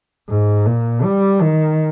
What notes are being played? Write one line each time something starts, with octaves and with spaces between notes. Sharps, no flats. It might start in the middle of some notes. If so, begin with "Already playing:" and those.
G#2
A#2
G3
D#3